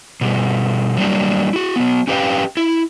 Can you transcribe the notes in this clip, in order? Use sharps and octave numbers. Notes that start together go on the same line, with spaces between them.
B2 G3 G#4
F#3 G3 A#3 D4
E4 F#4
F#3 B3
C#4 G4 B4 E5 F5 G5
E4